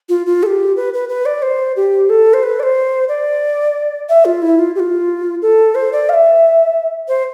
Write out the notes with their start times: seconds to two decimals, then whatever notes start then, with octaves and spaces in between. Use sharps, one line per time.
0.09 F4
0.26 F4
0.43 A4
0.46 G4
0.77 B4
0.94 B4
1.09 B4
1.26 D5
1.42 C5
1.76 G4
2.10 A4
2.34 C5
2.43 B4
2.60 D5
2.63 C5
3.09 D5
4.09 E5
4.25 F4
4.42 E4
4.59 F4
4.75 G4
4.80 F4
5.42 A4
5.75 C5
5.93 D5
6.09 F5
6.14 E5
7.08 C5